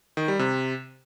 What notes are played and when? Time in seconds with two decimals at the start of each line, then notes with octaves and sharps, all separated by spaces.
0.17 D#3
0.28 G3
0.39 C3